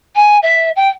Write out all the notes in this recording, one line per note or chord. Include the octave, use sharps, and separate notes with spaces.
G#5
E5
G5